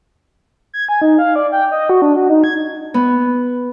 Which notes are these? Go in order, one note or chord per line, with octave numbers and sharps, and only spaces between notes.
G#6
G#5
D#4
F5
D5
G5
D#5
F#4
D4
F#4
D#4
G#6
B3